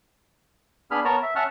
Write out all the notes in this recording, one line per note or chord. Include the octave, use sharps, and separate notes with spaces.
B3 D4 G#4 B5 F6
B3 A#4 C#5 A5 A#5
E5
C#4 E5 F#5 A5 C#6 F6